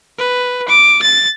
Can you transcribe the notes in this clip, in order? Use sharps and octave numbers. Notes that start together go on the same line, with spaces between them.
B4
D6
A6